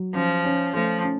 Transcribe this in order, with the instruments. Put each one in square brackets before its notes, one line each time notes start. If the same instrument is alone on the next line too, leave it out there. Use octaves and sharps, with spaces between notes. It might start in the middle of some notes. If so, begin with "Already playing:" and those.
Already playing: [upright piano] F#3
[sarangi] F3 [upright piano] C#4
[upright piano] C#4
[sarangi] F3 [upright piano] A3
[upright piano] C#4